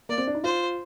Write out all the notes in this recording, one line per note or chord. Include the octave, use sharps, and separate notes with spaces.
A#3 D5
C4
D4
D#4
F4 C5